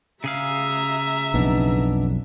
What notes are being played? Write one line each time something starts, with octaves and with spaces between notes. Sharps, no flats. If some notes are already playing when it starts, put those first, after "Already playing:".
C#3 G#4 E5 F5 A#5
B1 F2 B3 D4 D#4